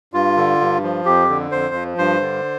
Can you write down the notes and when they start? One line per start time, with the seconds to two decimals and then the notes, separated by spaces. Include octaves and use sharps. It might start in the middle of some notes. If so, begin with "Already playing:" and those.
0.14 G2 F4
0.37 D3
0.61 G2
0.83 F3
1.05 F2 G4
1.29 D3
1.52 F2 C5
1.75 F3
1.98 G2 C5
2.21 D3